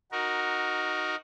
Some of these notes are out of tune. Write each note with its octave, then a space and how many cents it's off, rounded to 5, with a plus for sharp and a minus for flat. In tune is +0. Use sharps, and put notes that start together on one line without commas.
D#4 -5 F#4 +0 A#4 +10